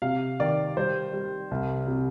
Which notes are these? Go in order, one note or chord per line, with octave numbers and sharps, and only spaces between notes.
C3 F5
D#3 D5
G3 C5
G3
C2
C3